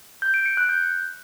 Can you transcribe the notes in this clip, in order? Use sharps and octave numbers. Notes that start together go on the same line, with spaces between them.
G6
D7
C#7
F#6
G6